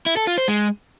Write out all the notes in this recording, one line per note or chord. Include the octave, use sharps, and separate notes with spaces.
E4
A4
F4
C5
G#3